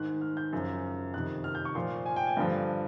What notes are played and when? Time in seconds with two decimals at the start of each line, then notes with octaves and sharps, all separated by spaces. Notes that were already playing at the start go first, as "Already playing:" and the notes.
Already playing: G#2 D#3 F#6
0.21 F6
0.37 G6
0.53 F#2 C#3 F3
1.14 F2 C3 D#3 F#6
1.44 F6
1.55 G6
1.65 C#6
1.75 A#2 F3 C6
2.06 G#5
2.16 G5
2.27 G#5
2.37 G2 D3 F3